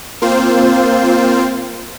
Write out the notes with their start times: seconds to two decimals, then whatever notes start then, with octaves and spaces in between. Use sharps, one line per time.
0.22 A#3 C4 F4 C5